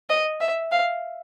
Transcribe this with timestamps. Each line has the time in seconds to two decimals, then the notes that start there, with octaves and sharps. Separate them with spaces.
0.10 D#5
0.41 E5
0.72 F5